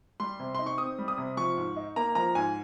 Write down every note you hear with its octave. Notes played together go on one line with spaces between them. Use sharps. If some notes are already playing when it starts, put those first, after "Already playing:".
G3 C6
C3
D#4 C6
C#6
C4 D#6
G3
D#6
C3
F3 C#6
G#2
D#4
A#3 A#5
F3 A#5
G#2 G#5